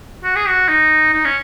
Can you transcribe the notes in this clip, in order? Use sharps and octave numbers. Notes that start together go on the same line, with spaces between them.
F#4
G#4
F#4
D#4
D#4
C#4